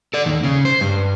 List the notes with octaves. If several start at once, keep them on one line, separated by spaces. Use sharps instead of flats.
A4 D5
D#2 D#3
C#3
C5
G2